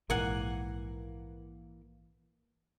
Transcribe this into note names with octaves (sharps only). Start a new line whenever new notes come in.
A#1 G#2 E3 A#3 A#4 F#5 G#5